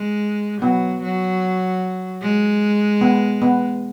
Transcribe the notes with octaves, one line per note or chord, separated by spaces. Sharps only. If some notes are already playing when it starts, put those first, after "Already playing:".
Already playing: G#3
F#3 B3
F#3
G#3
B3
B3